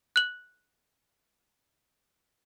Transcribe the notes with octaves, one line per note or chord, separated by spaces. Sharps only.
F#6 F#7